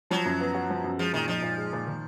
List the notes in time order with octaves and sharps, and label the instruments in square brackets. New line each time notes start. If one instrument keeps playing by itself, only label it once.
[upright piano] F3 [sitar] F#3
[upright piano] F#2
B3
F#4
F3
F#2
[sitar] F3 [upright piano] G#3
[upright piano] A#2 [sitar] D#3
[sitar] F3 [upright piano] D#4
[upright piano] A#2
G#3
A#2
D#3